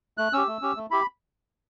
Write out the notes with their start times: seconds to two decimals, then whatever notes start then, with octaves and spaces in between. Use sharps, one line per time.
0.18 A3 F#6
0.33 C#4 G4 E6
0.48 A3
0.62 C#4 G4
0.76 A3
0.91 E4 G4 B5